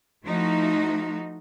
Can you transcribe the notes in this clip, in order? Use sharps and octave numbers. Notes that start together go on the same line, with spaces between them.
F3 A3 D#4 E4 F#4